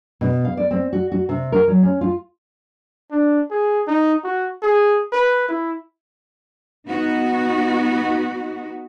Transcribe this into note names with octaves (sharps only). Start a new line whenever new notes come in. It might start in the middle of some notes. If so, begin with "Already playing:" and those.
B2
F5
D5
C4
F#4
F#4
C3
A#4
F#3
C#4
F4
D4
G#4
D#4
F#4
G#4
B4
E4
B3 D#4 F#4